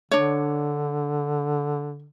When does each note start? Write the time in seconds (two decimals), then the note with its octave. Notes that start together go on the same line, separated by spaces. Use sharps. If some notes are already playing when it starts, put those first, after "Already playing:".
0.11 D3 D4 C#5